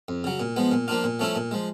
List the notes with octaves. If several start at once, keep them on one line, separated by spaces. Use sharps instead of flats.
F2
C#3 F#3
A#2
F3 G#3 B3
A#2
F3 A#3 D4 F4
A#2
F3 A3 C#4 E4
A#2
F3 G#3